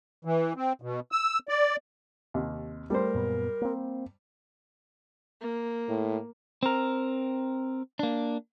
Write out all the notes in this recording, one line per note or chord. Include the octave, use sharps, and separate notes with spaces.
E3
C4
B2
E6
D5
D#2 C3
G3 A3 A#4 C5
F#2 A#2 B3
A#3 C4
A#3
A2
C4 A#4
A#3 D4